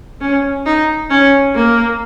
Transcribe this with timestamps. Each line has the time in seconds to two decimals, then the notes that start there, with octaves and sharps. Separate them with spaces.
0.21 C#4
0.66 D#4
1.10 C#4
1.55 A#3